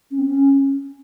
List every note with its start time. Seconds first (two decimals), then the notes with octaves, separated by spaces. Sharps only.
0.11 C#4
0.19 C4
0.26 C#4